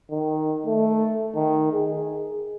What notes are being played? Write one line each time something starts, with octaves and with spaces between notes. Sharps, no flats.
D#3
A3
D#3
G#4